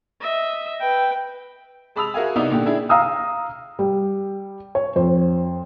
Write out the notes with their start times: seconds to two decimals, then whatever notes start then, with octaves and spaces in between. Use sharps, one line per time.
0.21 D#5 E5
0.80 B4 G5
1.96 G#3 A5 B5 D#6 E6 F7
2.14 F#4 G#4 A#4 E5 F5 G#5
2.36 C2 B3 D#4 E4 D5 F7
2.50 A#2 D3 G4
2.65 D4 E4 G#4
2.89 F5 A#5 D#6 E6
3.79 G3
4.75 C#5
4.96 F2 C5